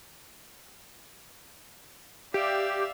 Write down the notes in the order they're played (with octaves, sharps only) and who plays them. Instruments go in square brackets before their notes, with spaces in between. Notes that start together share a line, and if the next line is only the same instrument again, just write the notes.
[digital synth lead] G4 [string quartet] D5 E5 F5